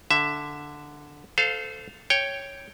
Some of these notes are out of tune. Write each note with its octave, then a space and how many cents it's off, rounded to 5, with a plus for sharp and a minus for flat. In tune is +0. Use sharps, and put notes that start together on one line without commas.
D3 +0 E5 +5
A4 +0 C5 -25 F5 +5
C#5 +0 G5 +0